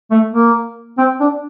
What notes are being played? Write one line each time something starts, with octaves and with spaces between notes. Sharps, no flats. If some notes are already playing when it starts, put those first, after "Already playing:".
A3
A#3
C4
D4